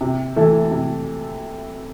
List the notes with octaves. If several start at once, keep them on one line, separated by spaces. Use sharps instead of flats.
C3
E3 A3 E4 A4
C3